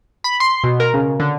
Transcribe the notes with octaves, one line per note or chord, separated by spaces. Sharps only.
B5
C6
B2
A#4
C#3
D3